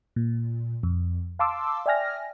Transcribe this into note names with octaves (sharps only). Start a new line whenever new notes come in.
A#2
F2
F5 A5 C6 D6 E6
D5 E5 G5 G#5 F6 A#6